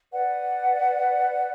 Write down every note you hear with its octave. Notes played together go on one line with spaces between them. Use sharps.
B4 D5 F#5